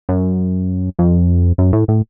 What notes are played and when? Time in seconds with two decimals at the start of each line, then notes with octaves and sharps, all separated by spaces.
0.09 F#2
0.99 F2
1.58 F#2
1.73 A2
1.88 A2